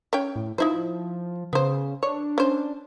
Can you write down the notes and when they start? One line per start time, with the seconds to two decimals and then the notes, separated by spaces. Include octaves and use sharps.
0.13 C#4 C#5 G5
0.36 A2
0.58 F3 D#4 E4 C5
1.53 C#3 B3 C5
2.03 D4 C#5
2.38 C#4 C5